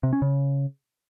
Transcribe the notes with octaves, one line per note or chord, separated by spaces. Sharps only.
C3
C#4
C#3